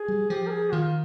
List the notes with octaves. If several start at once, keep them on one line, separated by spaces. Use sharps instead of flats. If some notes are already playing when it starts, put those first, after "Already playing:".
Already playing: G#4
G3
F3 G4
A#4
G#4
D#3 F4